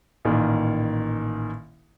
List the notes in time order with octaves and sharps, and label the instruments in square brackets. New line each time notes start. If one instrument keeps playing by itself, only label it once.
[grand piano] A1 A#2 D#3 A#3